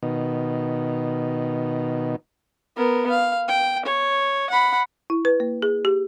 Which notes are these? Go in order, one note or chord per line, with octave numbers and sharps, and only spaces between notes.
B2 D#3
B3 A#4
F5
G5
C#5
F#5 B5
E4
B4
A#3
G#4
G4